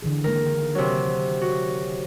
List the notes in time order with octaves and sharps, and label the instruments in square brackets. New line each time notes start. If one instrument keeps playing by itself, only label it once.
[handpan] D3 E3 G#4
[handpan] D#3 G#3 A#3 [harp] A#4
[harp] C3 F#3
F#4